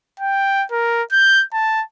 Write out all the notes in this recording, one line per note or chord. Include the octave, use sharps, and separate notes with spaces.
G5
A#4
G6
A5